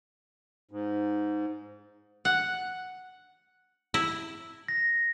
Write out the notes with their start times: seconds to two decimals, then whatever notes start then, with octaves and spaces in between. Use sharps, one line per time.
0.71 G#2
2.25 F#5
3.94 E4
4.68 A#6